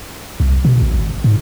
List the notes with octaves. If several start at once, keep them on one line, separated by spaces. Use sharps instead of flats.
C2
B2
A1
G#1
G#2